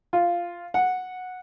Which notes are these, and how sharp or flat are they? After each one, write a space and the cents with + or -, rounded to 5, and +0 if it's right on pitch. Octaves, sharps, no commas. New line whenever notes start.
F4 -5
F#5 -10